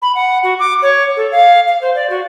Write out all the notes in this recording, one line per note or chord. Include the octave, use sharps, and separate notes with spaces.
B5
F#5
F#4
D6
C#5
A4
F5
F5
C5
D5
F#4